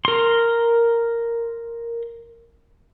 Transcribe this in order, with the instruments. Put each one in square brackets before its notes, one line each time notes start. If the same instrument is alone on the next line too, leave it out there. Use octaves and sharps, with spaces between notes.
[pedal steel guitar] A#4 C6